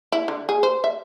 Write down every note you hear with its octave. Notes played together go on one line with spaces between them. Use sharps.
E4
D3
G#4
C5
E5